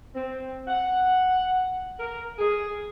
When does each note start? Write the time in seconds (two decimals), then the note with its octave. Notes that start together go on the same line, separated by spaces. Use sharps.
0.14 C4
0.67 F#5
1.98 A#4
2.37 G#4